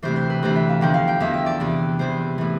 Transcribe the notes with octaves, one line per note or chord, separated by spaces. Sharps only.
D2 C3 E3 C5
C5
B4
D2 C3 E3 C5
E5
F5
E2 D3 F3 G5
F5
G5
E2 D3 F3 E5
E5
D5
E2 C3 E3
E2 C3 E3 C5
A2 E3